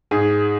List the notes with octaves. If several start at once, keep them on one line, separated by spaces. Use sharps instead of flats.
G#2 G#4